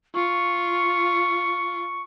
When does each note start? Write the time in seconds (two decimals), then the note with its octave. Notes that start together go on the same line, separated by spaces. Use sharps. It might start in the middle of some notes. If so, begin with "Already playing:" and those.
0.15 F4 C#6